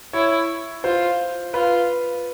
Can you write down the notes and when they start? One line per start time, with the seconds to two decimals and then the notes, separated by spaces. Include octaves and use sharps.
0.13 E4 C#5
0.84 F4 C5
1.54 F4 B4